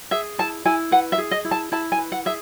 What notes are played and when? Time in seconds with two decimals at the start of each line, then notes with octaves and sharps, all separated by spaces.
0.11 G#4 E5
0.38 E4 A5
0.65 E4 G#5
0.91 B4 F#5
1.12 E5
1.18 G#4
1.31 D#5
1.45 E4
1.51 A5
1.72 E4 A5
1.92 G#5
1.98 B4
2.12 F#5
2.26 G#4 E5